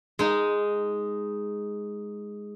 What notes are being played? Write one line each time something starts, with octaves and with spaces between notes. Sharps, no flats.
G#3 D#4